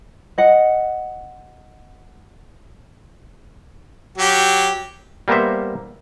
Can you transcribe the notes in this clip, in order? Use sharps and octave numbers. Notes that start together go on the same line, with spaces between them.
D#5 F#5
F#3 G4
G3 A#3 B3 A#4 C5 E5